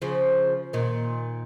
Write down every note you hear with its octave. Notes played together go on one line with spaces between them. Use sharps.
C#3 F3
A#2 D#3